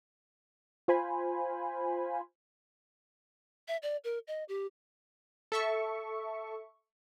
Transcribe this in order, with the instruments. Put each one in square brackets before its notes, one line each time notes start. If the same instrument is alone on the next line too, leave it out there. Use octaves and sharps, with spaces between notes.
[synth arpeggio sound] F4 C5 G#5 B5
[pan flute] E5
D5
A#4
D#5
G4
[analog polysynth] A4 E5 C#6